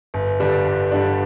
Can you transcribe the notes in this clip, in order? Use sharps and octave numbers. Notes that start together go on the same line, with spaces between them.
G1
G2 D3 G3 D4
G1
G2 D3 G3 D4